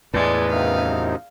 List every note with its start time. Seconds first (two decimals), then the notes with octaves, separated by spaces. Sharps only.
0.14 E2 A2 G#3 B4 D5
0.49 F#2 C3 D#3 F5